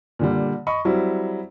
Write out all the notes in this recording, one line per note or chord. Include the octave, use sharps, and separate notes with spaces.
A#2 D3 G3
D#5 B5 C#6
F#3 G3 C4 E4